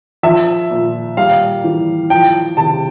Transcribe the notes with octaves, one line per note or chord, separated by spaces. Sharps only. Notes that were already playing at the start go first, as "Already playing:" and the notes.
F3 E5
A#2
G3 F5
E3
F3 G5
C3 A5